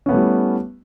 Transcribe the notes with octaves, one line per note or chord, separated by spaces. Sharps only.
G3 A3 B3 C#4 E4